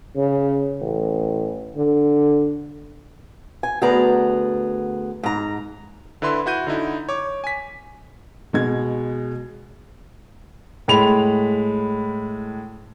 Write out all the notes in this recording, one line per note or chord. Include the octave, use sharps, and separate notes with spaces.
C#3
A1
D3
G#5
D2 B3 G#4 D5 A#5
G#2 A#5
D3 E4 B4 E5 C6
E4 F#4 G6 D#7
D3 D#4 E4
C#5 D6
G#5 B6
B2 G#3 G#6
A2 G#3 B5 F7